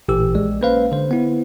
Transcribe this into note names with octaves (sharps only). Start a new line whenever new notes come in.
A1 A#2 E3 G4 E6
A#1 G#3 D5
A#3 C#4 B4 C5 F5
D3 C5
B3 E4